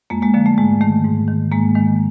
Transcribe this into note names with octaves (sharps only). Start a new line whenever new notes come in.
F2 G#3 A#3
G#3 A#3
D3 F3 G#3 A#3
A3
G#2 G#3
D#3 A3
G#2
D#3
G#2 G#3 A#3
D#3 G#3